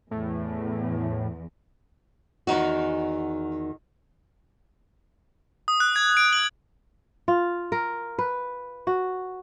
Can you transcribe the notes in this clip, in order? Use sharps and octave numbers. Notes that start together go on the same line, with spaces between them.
E2 A2
E2 D#3 D#4 F#4
D#6
F#6
G#6
D7
F#7
F4
A#4
B4
F#4